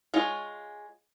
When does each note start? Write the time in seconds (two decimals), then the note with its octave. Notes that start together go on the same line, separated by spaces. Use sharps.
0.14 G#3 F4 C#5